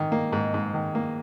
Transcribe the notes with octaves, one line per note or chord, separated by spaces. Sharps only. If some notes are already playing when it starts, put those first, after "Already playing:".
Already playing: G#2 D#3
A#3
G#2
G#2
D#3
A#3